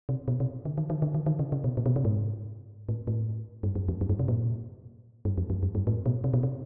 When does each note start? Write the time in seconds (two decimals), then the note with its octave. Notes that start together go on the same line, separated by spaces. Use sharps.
0.09 C3
0.28 B2
0.40 C3
0.65 D3
0.78 D#3
0.90 D#3
1.02 D3
1.14 D#3
1.26 D#3
1.39 C#3
1.52 C#3
1.64 B2
1.77 A#2
1.86 B2
1.96 C3
2.05 G#2
2.89 A2
3.07 A2
3.63 G2
3.75 F#2
3.88 F2
4.01 F#2
4.09 G2
4.19 C3
4.28 A#2
5.25 G2
5.38 F2
5.50 F2
5.63 F#2
5.75 G2
5.87 A2
6.06 B2
6.24 C3
6.34 B2
6.43 C3